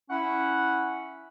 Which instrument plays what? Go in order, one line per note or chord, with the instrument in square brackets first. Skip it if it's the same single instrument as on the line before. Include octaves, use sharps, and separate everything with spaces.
[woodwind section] C#4 E4 F#5